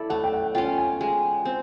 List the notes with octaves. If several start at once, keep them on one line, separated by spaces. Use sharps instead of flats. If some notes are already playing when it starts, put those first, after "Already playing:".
Already playing: E4 A4 D5 E5
A3 F#5
G5
F#5
C#4 F4 G5
G#5
G#3
C4